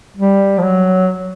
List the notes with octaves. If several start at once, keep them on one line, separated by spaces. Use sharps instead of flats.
G3
F3
F#3